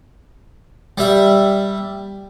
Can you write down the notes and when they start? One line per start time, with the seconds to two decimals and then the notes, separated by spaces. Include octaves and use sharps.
0.98 G3 E5